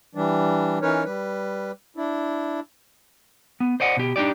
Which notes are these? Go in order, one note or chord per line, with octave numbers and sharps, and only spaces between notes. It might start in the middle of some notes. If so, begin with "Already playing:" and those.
E3 G3 D4
E3 C#4 D#4 A#4 B4 C#5
G3 B4
D4 E4
B3
C5 D5 D#5 F#5
B2 G4
D4 D#4 G4 D5